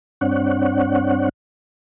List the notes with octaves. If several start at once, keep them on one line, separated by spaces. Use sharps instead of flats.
G2 C4 D4 C#5 F#5